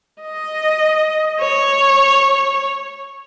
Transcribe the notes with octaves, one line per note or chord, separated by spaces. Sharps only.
D#5
C#5